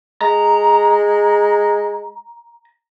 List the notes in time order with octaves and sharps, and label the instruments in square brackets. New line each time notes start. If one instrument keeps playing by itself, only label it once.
[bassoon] G#3 [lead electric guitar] A#5